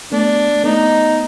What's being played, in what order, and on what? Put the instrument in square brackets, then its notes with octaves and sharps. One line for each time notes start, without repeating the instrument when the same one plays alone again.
[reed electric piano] A3 B3 [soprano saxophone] D4
[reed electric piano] A3 B3 [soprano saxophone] D#4